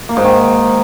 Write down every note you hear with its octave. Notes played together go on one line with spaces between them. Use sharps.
A#3
G#2
D#3